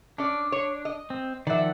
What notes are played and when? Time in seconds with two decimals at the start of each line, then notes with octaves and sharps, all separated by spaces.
0.18 C#4 D4 D5
0.52 C#5
0.85 D#5
1.10 C4
1.47 D#3 F3 D5 E5 F#5